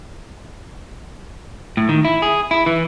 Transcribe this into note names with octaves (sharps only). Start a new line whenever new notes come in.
A2
D#3
E4
G#4
E4
E3